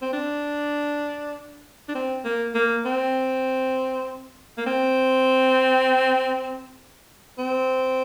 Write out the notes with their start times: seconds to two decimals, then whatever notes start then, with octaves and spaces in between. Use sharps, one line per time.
0.02 C4
0.13 D4
1.89 D4
1.95 C4
2.25 A#3
2.55 A#3
2.85 C4
4.58 A#3
4.67 C4
7.39 C4